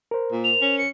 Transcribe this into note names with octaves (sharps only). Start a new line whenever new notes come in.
A#4 C5
A#2
F7
C#4
C#7